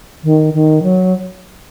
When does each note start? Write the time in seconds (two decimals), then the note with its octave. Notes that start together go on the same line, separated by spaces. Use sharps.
0.24 D#3
0.54 D#3
0.83 F#3